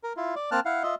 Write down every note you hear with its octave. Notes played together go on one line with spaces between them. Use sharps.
A#4
E4 F4
D5
A#3 C4 A5 F6 F#6
E4 F5 F#5
F4 D#5 E5